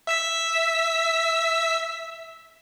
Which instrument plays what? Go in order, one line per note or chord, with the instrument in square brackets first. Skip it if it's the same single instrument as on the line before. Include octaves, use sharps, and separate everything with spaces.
[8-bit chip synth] E5 E6 B6